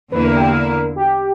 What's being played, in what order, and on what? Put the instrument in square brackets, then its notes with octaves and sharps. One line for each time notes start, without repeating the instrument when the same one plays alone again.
[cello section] E2 D3 A#3 E4 [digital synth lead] B4
[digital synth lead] A#4
G4
A#4
G4